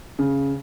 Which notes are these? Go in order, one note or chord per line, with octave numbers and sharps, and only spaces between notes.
C#3